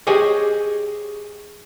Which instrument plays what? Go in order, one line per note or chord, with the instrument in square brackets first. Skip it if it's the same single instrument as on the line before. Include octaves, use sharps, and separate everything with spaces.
[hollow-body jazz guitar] G4 G#4 C5 C#5 D#5 G#5